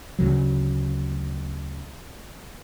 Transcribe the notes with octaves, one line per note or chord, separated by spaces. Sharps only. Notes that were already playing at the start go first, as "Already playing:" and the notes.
D2 C#3 F#3